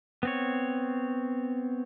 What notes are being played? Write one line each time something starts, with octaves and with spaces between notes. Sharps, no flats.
B3 C4 C#5